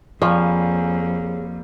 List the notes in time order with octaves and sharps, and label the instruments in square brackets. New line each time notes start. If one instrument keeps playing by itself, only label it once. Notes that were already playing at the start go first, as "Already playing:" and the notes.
[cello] F2 [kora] F3 [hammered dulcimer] G3 A#3 [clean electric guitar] G#4 C#5